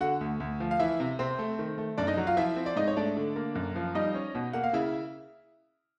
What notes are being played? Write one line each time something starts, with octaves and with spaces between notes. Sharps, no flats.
D3 F#4 F#5
D2
D2
F3
F5
E3 E4 E5
C3
C3 C4 C5
A3
D#3
A3
F#2 D4 D5
D#4 D#5
F#3
F4 F5
F3 E4 E5
C4
D5
G#2 D#4 D#5
C#5
A3 D4 D5
D3
A#3
F#2
F3
G3 D#4 D#5
C#4
B2
A#3 F#5
F5
C#3 E4 E5